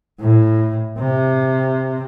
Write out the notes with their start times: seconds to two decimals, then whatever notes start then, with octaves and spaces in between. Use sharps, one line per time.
0.20 A2
0.98 C3